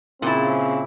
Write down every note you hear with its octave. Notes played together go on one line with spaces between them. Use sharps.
A#2 C#3 C4 E4